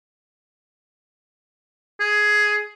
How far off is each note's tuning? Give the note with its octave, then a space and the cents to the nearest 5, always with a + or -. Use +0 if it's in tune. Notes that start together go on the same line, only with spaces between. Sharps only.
G#4 +10